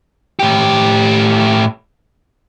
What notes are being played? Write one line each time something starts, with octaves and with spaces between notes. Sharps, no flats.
A2 G4